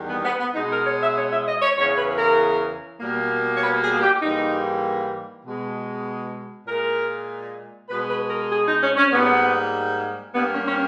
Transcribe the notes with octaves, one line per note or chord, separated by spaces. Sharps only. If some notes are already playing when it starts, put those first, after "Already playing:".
Already playing: E2 D#3 G3
B3
B3
B3
B2 G#3 D#4
A#4
C#5
E5
C#5
E5
D#5
C#5
E2 C#3 E3 C#5
B4
A#4
B2 G3 A#3
C#5
B4
G#4
G4
G#2 E3 G3 A#3 D#4
B2 G#3
A#2 G#3 A#4
B2 G#3 B4
B4
A#4
G#4
D#4
C#4
C#4
G#2 G3 A#3 B3
G2 G3 A#3 B3
C#4
C#4